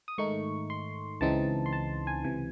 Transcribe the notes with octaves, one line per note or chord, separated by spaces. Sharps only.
D#6
G#2 D#3 A3 D#4 C#6
C6
C#2 C#3 E3 C4 D#4 A5
C6
A5
G#5
C#2 C3 E3 G#5